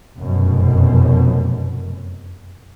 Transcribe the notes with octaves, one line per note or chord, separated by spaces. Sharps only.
F1 F#2 B2